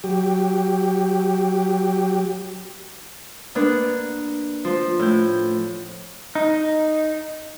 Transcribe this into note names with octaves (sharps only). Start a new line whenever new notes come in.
F#3 G4
A#3 B3 D4
F3
A2 G6
D#4